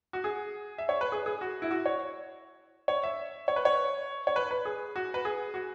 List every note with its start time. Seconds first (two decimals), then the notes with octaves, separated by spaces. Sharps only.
0.13 F#4
0.24 G#4
0.78 E5
0.89 C#5
1.01 B4
1.12 G#4
1.26 G#4
1.41 F#4
1.62 E4
1.71 F#4
1.86 C#5
2.88 C#5
3.04 E5
3.48 C#5
3.56 B4
3.65 C#5
4.27 C#5
4.36 B4
4.51 B4
4.65 G#4
4.96 F#4
5.14 B4
5.25 G#4
5.54 F#4